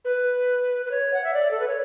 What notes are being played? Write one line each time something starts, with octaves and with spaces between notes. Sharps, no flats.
B4
B4
C#5
F#5
E5
D5
A4
B4
C#5